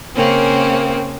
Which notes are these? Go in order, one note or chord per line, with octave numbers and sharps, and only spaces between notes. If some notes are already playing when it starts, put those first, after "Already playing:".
C#3 A#3 C4 C#4